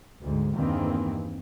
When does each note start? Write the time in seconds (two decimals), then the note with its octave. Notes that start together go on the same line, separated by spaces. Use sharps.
0.21 D2 G#2
0.54 E2 G2 D#3 E3 A#3 C4